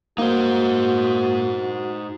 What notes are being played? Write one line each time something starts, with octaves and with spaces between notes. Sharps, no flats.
A#3 D#4 F#4 C5